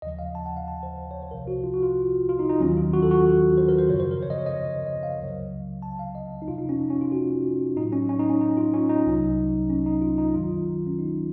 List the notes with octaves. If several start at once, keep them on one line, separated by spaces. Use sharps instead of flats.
D#2 C#3 F3 D#5
F5
A5
F#5
F5
A5
C5
C#5
C5
C2 C3 F3 A#4
F#4
F4
F#4
F4
F4
D#4
D#4
D#2 D#3 F#3 C#4
F4
F#4
A4
F#4
C5
A#4
C5
F#2 C#3 F3 C#5
C5
A#4
C#5
D#5
C#5
D#5
C#5
D#5
F5
C#2 C#3 F#3
A5
F5
D#5
D#4
F2 C3 F3 F4
D#4
C#4
D#4
C#4
F4
F#4
A2 F#3 D#4
C#4
C#4
D#4
C#4
D#4
F4
C#4
D#4
C2 C3 F#3
C#4
D#4
F4
D#4
F#2 D#3 F#3 F4
C#4
D#4